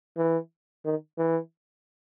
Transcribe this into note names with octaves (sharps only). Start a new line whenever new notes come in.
E3
D#3
E3